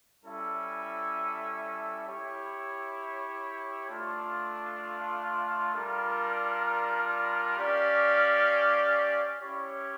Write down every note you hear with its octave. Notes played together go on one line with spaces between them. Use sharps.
G3 C#4 E4 A4 E5
E4 G4 C#5
A3 D4 F4
G3 D4 F4 A#4
C#4 G4 D5 F5
C#4 E4 G4 C#5